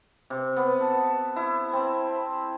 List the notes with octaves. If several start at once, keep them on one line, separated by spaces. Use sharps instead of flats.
C3
B3
A4
E4
C4